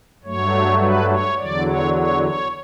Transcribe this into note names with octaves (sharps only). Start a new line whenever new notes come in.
G2 F#3 A3 C#5
B4
C#5
E2 D3 F#3 D5
C#5
C#5
C#5